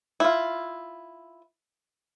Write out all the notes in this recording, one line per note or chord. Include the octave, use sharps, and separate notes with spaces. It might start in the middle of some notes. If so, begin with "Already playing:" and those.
E4 F4